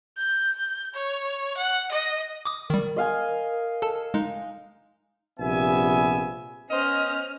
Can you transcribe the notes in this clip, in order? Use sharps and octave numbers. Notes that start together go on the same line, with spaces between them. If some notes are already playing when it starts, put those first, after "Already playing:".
G6
C#5
F#5
D#5
D6 D#6
D#3 G3 A#4
D#5 F5 G#5
A4 A5
G#3 D#4
A#1 C3 G3 B3 E5 G#5
B3 C#4 C5 D#5 F6